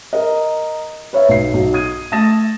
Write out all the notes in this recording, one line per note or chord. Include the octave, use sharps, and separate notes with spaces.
A#4 D#5
B4 C#5 E5 F5
B1 C7
B1 F#3
D#6 G#6 D#7
A3 A5 D#6 A6 A#6 E7